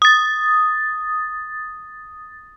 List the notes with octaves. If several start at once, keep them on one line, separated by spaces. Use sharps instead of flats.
D#6 A6